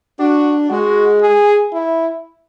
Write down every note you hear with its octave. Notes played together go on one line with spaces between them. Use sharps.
D4 F#4
G#3 F#4
G#4
E4